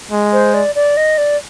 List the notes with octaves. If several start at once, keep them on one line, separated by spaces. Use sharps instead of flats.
G#3
C5
D5
D5
D#5
D5